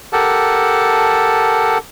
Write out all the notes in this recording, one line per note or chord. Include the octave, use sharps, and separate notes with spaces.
G4 A4 A#4 F#5 A5